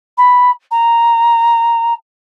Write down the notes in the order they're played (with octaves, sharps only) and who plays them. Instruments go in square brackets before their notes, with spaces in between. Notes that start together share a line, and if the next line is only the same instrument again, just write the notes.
[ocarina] B5
A#5